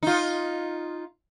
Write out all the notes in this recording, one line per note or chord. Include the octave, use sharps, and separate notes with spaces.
D#4 F4